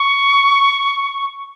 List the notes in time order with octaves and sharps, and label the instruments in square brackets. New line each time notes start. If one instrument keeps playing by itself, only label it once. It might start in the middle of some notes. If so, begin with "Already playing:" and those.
Already playing: [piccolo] C#6